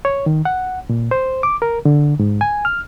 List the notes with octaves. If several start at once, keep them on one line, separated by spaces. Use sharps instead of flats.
C#5
D#3
F#5
A#2
C5
D6
A#4
D3
G#2
G#5
F6